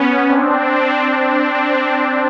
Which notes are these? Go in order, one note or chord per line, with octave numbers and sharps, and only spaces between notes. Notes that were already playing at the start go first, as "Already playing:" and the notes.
Already playing: B3 C#4
C4 D4
C4 D4